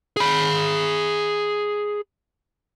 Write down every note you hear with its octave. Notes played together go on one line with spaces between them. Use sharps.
G#4 B5